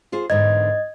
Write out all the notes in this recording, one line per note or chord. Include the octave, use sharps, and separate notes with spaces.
F4 G#4 C5
E2 G#2 D3 D#5 G#6